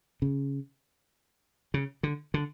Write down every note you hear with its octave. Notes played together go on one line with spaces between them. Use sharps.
C#3
C#3
D3
D3